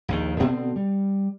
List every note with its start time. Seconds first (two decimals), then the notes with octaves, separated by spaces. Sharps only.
0.08 A#1 D#2 D#3
0.40 B2 D3 B3 C4
0.76 G3